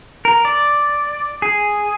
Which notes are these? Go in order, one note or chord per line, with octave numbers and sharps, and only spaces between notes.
A#4
D5
G#4